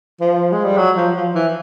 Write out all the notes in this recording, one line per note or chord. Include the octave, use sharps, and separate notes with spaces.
F3
G#3
G3
F#3
F3
F3
E3